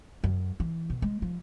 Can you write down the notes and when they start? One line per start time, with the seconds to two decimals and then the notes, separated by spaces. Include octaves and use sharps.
0.24 F#2
0.60 E3
0.90 B2
1.02 G#3
1.22 F3